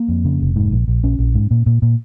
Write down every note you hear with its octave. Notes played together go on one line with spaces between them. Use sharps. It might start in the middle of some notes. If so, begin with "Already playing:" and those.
Already playing: A#3
F2
C#3
F1
G#2
A#1
A#1
A#1 C#4
A#1
G#2
A#2
A#2
A#2